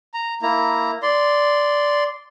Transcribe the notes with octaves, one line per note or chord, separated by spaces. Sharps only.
A#5
A#3 E4 A#5
D5 C6